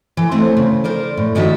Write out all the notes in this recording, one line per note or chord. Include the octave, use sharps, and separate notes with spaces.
E3
A3 C4 C5 C#5
C#3
A#4 C5 D5
A2
G2 D#3 A3 D#4 F#4 E5